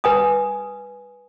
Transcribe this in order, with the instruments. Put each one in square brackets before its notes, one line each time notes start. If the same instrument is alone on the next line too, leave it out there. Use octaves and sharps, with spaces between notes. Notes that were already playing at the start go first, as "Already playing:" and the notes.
[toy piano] B4 G#5 D#6